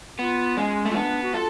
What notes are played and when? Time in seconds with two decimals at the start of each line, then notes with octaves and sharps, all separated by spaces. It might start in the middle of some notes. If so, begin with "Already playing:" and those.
0.19 B3 F4
0.57 G#3 C#4
0.86 A3 F4
0.95 B3 D4
1.23 F#4
1.34 F4 A4